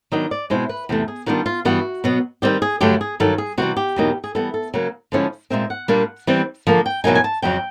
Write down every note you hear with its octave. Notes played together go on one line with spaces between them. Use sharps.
D#3 F#3 B3 D4 D#5
D5
B2 G#3 C4 E4 C5
B4
E2 C3 E3 A3
G#4
D#3 G3 B3 D4 F4 F#4
F4
G2 E3 G3 B3 F#4
B2 F#3 B3
D#3 G3 C4 G4
G#4
G2 D3 F#3 A3 G4
G#4
G2 D#3 F#3 A4
G#4
C3 E3 G3 F#4
G4
E2 B2 F#3 A#3 D#4
G#4
E3 G3 B3 A4
A4
C#3 F#3 A#3
D3 F3 G#3 C#4 E4
A#2 F3 G#3 C4 D#4 E5
F#5
A#2 G3 A#3 D4 F4
E3 G3 C4
D3 F3 A#3
G5
E2 B2 F#3 A#3 D#4 G#5
G#5
A5
F2 C#3 F#3 G5